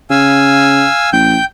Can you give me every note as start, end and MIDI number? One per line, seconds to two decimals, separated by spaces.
0.10 0.85 49
0.10 1.10 77
0.10 1.10 80
0.10 1.10 88
1.13 1.37 33
1.13 1.45 79
1.13 1.45 91